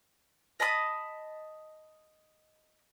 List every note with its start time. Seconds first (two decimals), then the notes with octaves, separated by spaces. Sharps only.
0.60 D#5 A5 B5 D#6